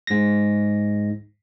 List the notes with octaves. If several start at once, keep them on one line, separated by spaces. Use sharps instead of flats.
G#2 A#6